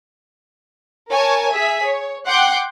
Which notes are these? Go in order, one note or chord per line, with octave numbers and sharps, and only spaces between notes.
A#4 C#5 G#5 A5
G#4 E5 B6
C#5
F#5 G5 C6 D6 F#6 G6